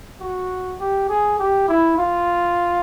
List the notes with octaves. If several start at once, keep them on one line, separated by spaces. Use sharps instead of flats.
F#4
G4
G#4
G4
E4
F4